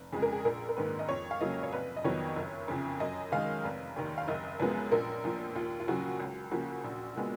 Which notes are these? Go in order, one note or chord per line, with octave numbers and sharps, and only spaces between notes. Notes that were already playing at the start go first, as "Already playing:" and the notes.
Already playing: F1
F2 C#3 G#3 G#4
A#4
G#4
A#1 A#4
A#4
G#2 D#3 A#3 B4
D#5
F2 C#5
F5
C#3 F#3 A#3 D#5
C#5
F1 B4
D#5
F2 D#3 F#3 B3 C#5
F#1
F2 C#3
F#2 D#5
D#3 G#3 F5
F1
D#2 D#3
F5
F#1 D#5
F#2 F3 G#3 B3 B4
A#1 A#4
A#2 F3 F4
D#2 F4
F4
C#3 F#3 F#4
C#2
C#3 F3 A#3 F#4
A#1
A#2 G#3 B3